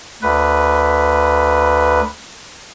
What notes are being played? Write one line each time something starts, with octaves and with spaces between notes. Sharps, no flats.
D2 B4